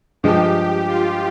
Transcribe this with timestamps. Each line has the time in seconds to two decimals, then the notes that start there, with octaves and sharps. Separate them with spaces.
0.23 G2 F3 G#3 G4
0.88 F4